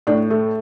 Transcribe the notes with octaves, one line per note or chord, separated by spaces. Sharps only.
A2 D4
A3